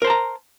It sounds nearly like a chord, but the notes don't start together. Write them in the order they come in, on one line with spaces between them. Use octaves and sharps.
A#4 C5 A5 A#5